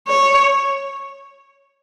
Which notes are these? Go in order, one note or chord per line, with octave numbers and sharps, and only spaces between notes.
C#5